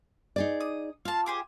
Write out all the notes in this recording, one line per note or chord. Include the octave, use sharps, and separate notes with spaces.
D#4 G#4 D5
D#6
F4 F5 A5
G4 G#4 C5